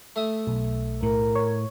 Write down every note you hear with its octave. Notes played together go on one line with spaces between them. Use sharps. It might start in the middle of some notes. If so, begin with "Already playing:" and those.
A3 E5 D#6
B1
A2 A#4
C#5